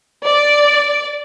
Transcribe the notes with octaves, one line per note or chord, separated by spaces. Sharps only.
D5